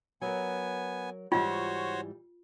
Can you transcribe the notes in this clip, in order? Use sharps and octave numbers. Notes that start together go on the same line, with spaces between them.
F#3 B3 A#4 G#5
G#2 E3 G3 F4 F#4 C5 C#5